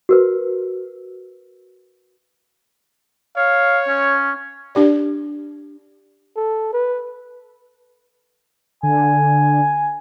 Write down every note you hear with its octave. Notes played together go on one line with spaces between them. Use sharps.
F#4 A#4 B4
C#5 F5
C#4
D4 G4 D5
A4
B4
D3 G#5